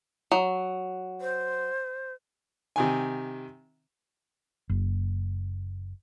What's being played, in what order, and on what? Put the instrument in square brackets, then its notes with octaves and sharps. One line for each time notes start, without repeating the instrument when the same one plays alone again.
[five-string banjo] F#3
[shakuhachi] C5
[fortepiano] C3 D#3 G#5
[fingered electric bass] F#1